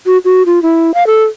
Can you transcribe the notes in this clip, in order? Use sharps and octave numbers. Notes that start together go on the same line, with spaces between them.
F#4
F#4
F4
E4
F5
A4